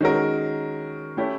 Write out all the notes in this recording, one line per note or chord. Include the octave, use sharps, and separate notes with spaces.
D#3 G#3 C#4 F#4 A#4
A3 C#4 E4 G4